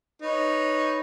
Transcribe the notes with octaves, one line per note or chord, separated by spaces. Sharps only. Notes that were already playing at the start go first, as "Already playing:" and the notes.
D#4 B4 C#5